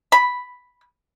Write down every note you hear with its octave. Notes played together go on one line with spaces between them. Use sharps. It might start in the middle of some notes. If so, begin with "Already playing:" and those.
B5